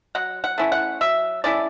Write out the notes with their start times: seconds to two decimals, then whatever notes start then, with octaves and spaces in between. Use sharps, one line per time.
0.15 F#3 F#5
0.44 F#5
0.58 A3 C#4 E4
0.72 F#5
1.01 F#3 E5
1.44 A3 C#4 E4 D5